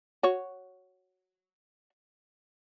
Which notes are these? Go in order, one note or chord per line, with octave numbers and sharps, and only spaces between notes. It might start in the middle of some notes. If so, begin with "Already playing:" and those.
F#4 C#5